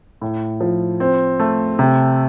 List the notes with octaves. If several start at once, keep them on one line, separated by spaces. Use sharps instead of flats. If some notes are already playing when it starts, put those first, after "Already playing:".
A2
F3
C4
A3
C3